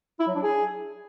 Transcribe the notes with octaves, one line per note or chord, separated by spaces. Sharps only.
E4
F#3
D4
G#4